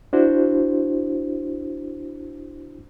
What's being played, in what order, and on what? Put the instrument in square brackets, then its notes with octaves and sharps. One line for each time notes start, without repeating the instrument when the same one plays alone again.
[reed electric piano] D4 E4 F#4 C5